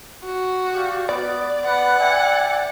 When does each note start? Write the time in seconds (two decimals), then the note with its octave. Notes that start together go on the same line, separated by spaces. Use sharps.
0.25 F#4
0.74 G4 D5 F5
1.09 B3 D5
1.65 B3 B4 F#5
2.00 E5 G5 G#5